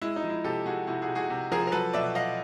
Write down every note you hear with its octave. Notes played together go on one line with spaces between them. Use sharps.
G#3 E4
D#4
F3
E4
C3 G4 A4
C3 F#4 G#4
C3 E4 F#4
F#4 G#4
C3
F#4 G#4
C3
F3 G#4 A#4
A#4
F#3 A4 B4
B2 D5 E5
F#3 D#5 F5